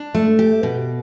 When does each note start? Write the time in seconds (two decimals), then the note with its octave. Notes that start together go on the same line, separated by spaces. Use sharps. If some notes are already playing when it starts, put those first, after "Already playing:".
Already playing: D4
0.14 A3
0.39 G4
0.63 B2